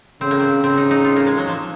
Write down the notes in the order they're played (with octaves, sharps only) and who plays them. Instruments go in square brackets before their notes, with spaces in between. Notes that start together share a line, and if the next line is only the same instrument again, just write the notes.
[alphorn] C#3 [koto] C4
[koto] A#3
C4
[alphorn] C#3 [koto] C4
[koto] D#4
D#4
F4
A#3
G#3
F#3
F3